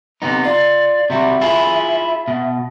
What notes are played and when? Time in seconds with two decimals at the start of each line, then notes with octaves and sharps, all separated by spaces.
0.22 C3 B3 D#4
0.44 F4 D5
1.10 C3 G3 F#4 E5
1.41 E4 F4 G#4
2.28 B2